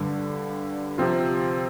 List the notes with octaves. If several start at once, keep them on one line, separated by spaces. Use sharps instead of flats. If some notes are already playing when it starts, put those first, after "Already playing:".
Already playing: G2 D3 G3
C3 F3 C4 F4